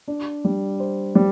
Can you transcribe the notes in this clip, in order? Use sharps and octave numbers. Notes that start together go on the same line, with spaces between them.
D4
G3
C5
G3